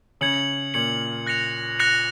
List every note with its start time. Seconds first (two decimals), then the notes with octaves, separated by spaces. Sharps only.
0.21 C#3 G#6 C#7 F#7
0.74 A#2 G#6 C#7 F#7
1.26 F#6 A#6 C#7 F7
1.79 F#6 A#6 C#7 F7